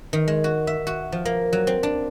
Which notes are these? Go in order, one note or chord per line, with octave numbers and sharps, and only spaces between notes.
D#3
G#3
F#4
E5
F#4
F3
A#3
F#3
C4
D4